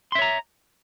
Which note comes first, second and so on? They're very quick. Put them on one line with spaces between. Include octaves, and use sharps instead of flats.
C6 E5 C#5 A#5